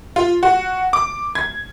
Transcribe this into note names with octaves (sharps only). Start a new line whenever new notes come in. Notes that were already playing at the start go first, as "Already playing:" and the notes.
F4
F#4
D6
G#6